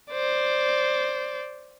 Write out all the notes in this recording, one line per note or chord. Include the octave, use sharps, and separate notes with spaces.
C5 D5